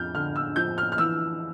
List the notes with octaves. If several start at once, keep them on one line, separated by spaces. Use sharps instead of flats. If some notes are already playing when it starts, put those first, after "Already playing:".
Already playing: F2 F6 G6
D3 F6
E6
F3 G6
F6
F6
E3 E6